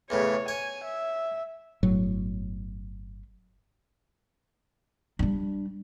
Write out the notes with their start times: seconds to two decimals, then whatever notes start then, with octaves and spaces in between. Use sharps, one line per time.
0.10 E2 A2 C#3 C#5
0.48 C#5 G#5
0.85 E5
1.83 G1 A2 F#3
5.19 G3 D4